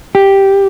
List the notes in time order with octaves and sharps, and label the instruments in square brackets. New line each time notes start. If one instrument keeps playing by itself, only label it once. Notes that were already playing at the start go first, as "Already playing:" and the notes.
[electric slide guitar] G4